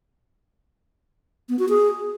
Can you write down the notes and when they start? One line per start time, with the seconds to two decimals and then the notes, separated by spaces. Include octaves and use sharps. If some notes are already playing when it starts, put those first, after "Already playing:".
1.49 B3
1.59 F#4
1.69 G#4